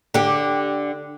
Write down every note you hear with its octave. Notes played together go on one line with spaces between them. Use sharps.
D3 G4